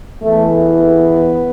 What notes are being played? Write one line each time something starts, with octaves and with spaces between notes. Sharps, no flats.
E2 E3 A3
B3